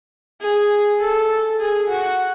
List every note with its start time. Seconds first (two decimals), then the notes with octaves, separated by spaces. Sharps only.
0.41 G#4
1.01 A4
1.59 G#4
1.89 F#4